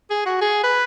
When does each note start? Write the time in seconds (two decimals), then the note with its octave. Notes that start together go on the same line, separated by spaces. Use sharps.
0.11 G#4
0.26 F#4
0.41 G#4
0.64 B4